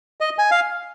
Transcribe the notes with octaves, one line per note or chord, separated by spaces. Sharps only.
D#5
G#5
F5